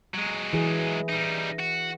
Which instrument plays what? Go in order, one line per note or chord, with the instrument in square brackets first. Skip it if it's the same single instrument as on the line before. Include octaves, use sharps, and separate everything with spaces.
[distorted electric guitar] F#3 G#3
[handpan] E3 G#4
[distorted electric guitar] G3 D#4
F#4